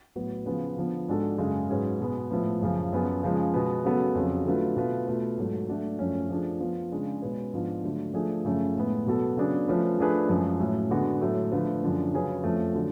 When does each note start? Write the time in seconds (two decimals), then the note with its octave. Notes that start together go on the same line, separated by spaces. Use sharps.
0.16 A2 F#3 B3 F#4 B4
0.46 C#3 F3 B3 F4
0.77 D3 F3 B3
1.08 G#2 G#3 D4 F#4 A4
1.38 F#2 C#3 G#3
1.69 G#2 F#3 C#4 G#4 B4
2.00 B2 G#3 B3
2.31 A2 F3 B3
2.61 F#2 C#3 F3
2.92 F#2 F3 B3 F4 G#4
3.23 C#3 F3 G#3
3.54 B2 G#3 B3
3.84 C#3 F#3 B3 F#4 A4
4.15 F2 C#3 F#3
4.45 D3 F#3 A3 F4 B4
4.76 B2 A3 F4 B4
5.07 B2 A3 F4 B4
5.37 G#2 F#3 A3
5.69 F#3 A3 D4 F#4
5.99 F#2 F3 A3 C#4
6.30 F3 A3 D4 G#4
6.60 F3 B3 F4
6.92 C#3 G#3 D4
7.22 B2 G#3 C#4 G#4 B4
7.53 G#2 F3 B3 D4 F4
7.84 D3 F#3 A3
8.14 F3 A3 D4 G#4
8.45 F#2 C#3 F3 A3 C#4
8.75 A2 G#3 B3
9.06 B2 F#3 B3 F#4 A4
9.37 C#3 F#3 B3 D4 G#4
9.68 F3 A3 C#4 F4 B4
9.99 F3 A3 D4 G#4 B4
10.29 F#2 F3 G#3
10.60 A2 F#3 C#4
10.90 D3 G#3 B3 F#4
11.21 A2 F#3 A3
11.52 D3 F3 A3 F4 B4
11.83 F#2 D3 F3
12.14 C#3 F#3 C#4 G#4 B4
12.44 F2 F3 A3 C#4
12.74 D3 F#3